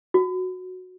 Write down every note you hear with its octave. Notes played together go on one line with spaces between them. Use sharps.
F#4